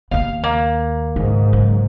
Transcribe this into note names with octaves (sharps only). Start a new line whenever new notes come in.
D#2 B3 F5
A#3
C#2 G#2 D#3
C#3 F#3